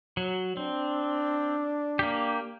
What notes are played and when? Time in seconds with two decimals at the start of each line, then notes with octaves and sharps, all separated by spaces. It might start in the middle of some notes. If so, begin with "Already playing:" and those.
0.17 F#3
0.57 C4 D4
1.99 A#3 G4